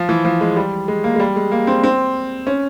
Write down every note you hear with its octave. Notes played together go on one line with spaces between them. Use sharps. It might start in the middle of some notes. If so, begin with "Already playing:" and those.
Already playing: F3
E3
F3
G#3
G3
G#3
A#3
G#3
G3
G#3
A#3
C4
C4
C#4